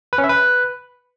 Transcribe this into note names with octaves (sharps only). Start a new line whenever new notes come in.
B4
C#4
E5
B4